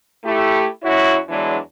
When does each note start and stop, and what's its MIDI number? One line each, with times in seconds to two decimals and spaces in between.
0.25 0.67 57
0.25 0.67 64
0.25 0.67 67
0.83 1.18 42
0.83 1.18 64
0.83 1.18 66
0.83 1.18 73
1.29 1.58 40
1.29 1.58 52
1.29 1.58 54
1.29 1.58 56
1.29 1.58 62